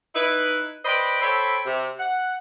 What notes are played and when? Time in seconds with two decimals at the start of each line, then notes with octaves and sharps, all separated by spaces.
0.14 D#4 E4 B4
0.85 B4 C5 D5 D#5 G5 B5
1.22 A4 C5 C#5 E5 G5 B5
1.66 C3
1.99 F#5